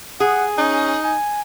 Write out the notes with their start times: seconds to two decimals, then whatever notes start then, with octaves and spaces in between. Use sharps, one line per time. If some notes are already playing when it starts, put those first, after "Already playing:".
0.20 G#4 F#5
0.58 C#4 D#4
1.04 G#5